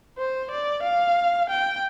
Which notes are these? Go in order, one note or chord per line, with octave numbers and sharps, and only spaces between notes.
C5
D5
F5
G5